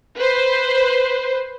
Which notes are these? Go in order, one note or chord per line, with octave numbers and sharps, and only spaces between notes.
B4 C5